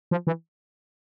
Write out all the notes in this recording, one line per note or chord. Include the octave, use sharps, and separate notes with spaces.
F3
E3